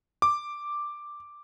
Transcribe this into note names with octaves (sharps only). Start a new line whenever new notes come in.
D6